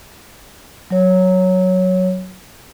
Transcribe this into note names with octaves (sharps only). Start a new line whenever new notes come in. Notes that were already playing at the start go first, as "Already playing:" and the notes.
F#3 C#5